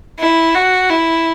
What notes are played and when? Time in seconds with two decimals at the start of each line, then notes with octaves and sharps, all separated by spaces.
0.19 E4
0.55 F#4
0.90 E4